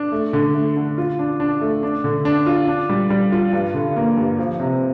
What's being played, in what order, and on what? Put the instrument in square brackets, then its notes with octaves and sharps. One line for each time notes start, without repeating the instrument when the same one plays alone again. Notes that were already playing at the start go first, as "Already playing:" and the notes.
Already playing: [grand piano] D4
A3
D3
A3
D3
F4
D4
D4
A3
D4
D3
D4
F4
D4
G3
G3
F4
G2
D3
A#3
G2
F3
C3